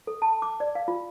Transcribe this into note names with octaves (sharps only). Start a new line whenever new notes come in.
A4
A5
D6
D5
F5
F4